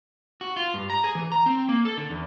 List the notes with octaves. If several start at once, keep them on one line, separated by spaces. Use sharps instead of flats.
F#4
F4
G2
A#5
G#4
E3
A#5
C4
A#3
A4
D3
E2